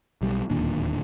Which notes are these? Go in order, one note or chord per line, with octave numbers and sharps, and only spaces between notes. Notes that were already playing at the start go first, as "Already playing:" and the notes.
B1 G3
D1 D#2 A#2 D4